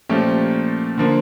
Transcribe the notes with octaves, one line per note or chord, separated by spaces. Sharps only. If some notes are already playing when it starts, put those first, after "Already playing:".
A#2 F3 A3 C#4 G4
D3 F3 A#3